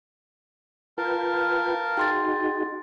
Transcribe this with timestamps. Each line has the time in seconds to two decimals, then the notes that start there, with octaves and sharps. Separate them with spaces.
0.98 F4 A#4 B4 F5 G5 A5
1.97 D#4 F#4 G#4 G5 C6 A6